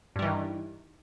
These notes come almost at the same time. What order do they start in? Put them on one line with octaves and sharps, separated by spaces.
G2 G3 E3 D#3